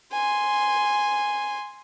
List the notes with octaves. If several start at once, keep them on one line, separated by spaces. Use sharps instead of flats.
G#5 C6